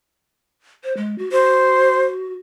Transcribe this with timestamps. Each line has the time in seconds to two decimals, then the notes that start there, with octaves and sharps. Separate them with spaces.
0.84 C5
0.97 G#3
1.18 F#4
1.32 F#4 C5